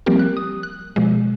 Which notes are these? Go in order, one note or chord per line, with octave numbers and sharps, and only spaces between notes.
F3 G3 A#3 C4 G4 A#4
F#6
D#6
F#6
B2 F3 G#3